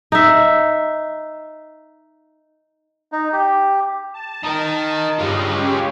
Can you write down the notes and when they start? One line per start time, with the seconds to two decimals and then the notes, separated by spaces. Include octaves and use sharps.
0.12 D#4 E5
3.12 D#4
3.33 G4
4.14 A5
4.43 D#4 A#4
5.19 G2 G3 G#3 F4 D#5
5.52 C#4 G4